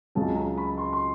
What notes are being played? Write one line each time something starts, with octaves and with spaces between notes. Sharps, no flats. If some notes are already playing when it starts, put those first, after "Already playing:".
C#2 C#3 F#3 A5
A#5
B5
C6
C6